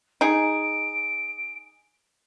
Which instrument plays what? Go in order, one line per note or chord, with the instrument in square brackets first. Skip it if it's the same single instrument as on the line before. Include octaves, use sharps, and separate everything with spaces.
[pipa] D#4 G#4 [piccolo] D7